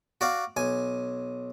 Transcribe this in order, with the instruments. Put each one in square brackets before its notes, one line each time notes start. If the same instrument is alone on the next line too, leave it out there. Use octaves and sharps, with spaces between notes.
[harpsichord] F#4 D5 F5
B1 G#5